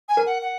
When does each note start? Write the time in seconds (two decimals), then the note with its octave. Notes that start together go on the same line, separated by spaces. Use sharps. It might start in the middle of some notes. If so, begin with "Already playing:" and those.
0.09 G#5
0.17 A#4
0.26 F#5
0.42 F#5